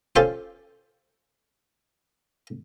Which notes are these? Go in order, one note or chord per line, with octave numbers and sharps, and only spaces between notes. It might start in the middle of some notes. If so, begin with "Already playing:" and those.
C#4 F4 G4 A4 C5